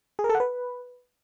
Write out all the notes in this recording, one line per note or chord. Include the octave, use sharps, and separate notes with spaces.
G#4
A#4
A4
F#5
B4